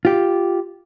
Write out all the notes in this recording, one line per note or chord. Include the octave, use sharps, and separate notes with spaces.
F4 G4